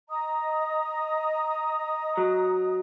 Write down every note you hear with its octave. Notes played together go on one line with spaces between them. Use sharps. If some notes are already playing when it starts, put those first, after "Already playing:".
D#5 A#5 D#6
F#3